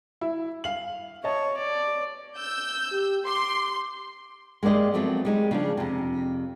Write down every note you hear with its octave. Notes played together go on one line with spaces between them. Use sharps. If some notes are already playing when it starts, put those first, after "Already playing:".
E4
F5 F#7
C#5 D#5 A5
D5
E6 G6
G4
C6 D6
G#3 A#3 G4 D5 D#5
F3 F#3 A3 B3 C4
G3 G#3 D#4
C#3 F3 D4
F2 C3